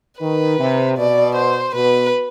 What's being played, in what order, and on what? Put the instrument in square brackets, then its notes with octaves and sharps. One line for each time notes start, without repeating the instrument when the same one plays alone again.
[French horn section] D#3 [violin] B4
[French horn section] C3
[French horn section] B2 [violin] D5
[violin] C5
[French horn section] B2 [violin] B4